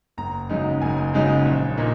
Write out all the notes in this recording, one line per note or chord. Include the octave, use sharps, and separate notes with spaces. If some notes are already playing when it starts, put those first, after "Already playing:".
F#1 A#5
F#2 C#3 G#3 D#4
F#1 G#5
F#2 C#3 G#3 D#4
A#1
A#2 A#3 D#4